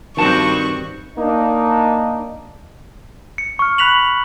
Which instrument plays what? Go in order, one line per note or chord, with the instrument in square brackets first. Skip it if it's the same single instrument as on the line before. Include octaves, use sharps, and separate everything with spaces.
[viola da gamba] G2 C4 F#4 [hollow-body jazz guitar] D#3 A5 [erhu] C#6
[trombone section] A#3 D4 D#4
[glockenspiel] C#7
C#6 F6
B5 F#6 B6 F7 F#7